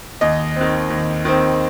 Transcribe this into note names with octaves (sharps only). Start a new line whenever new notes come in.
D#2 D#5
D#3 C4
D#2
D#3 C4